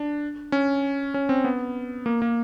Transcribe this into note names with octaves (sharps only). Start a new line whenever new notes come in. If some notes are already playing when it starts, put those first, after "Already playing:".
Already playing: D4
C#4
C#4
C4
B3
A#3
A#3